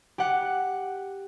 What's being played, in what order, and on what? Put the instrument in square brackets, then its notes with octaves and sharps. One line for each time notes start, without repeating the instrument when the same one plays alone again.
[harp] G4 F#5